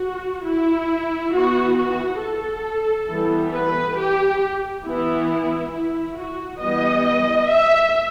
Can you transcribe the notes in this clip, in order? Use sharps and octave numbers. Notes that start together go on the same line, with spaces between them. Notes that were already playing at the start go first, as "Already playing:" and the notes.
Already playing: F#4
E4
E3 B3 F#4
F#4
A4
E3 G3 B3
B4
G4
E3 B3 E4
E4
F#4
E3 G3 B3 D#5
E5